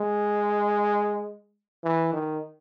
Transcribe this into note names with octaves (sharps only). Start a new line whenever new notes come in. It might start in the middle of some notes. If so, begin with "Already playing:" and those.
Already playing: G#3
E3
D#3